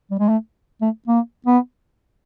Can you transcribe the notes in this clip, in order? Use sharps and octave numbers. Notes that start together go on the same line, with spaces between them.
G3
G#3
A3
A3
A#3
B3